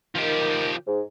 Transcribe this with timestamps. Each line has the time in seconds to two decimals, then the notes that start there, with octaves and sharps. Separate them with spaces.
0.15 D#3 F3 G4
0.87 G#2